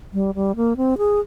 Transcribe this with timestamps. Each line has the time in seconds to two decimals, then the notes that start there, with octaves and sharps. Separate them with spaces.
0.13 G3
0.35 G3
0.56 A#3
0.77 C4
0.98 G#4